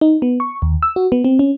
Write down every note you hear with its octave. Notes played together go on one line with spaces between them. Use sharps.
D#4
B3
C#6
D#2
E6
F#4
B3
C4
C#4